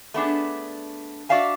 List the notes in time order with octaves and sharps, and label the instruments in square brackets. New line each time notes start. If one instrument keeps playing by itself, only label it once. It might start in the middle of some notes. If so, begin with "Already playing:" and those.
[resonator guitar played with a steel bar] A3 B3 D4 G#4
D4 F#4 D5 E5 F5 G#5